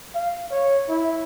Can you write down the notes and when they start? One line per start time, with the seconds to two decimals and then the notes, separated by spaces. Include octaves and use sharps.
0.14 F5
0.51 C#5
0.89 E4